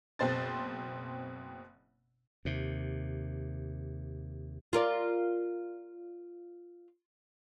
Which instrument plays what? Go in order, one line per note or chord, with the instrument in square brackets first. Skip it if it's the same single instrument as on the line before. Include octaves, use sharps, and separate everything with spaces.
[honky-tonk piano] F#1 B2 C4 C5 C6 A6
[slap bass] D#2 C3
[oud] F4 A#4 D5